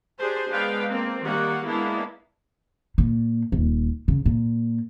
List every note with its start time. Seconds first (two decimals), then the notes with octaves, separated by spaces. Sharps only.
0.19 D4 G4 G#4 C5
0.49 G#3 B3 D4 B4 F5 G5
0.90 A#3 C4
1.23 D#3 G3 A#3 F#5
1.65 G#3 A#3 B3 D4 E4
2.98 A#2
3.52 D#1
4.08 C#3
4.26 A#2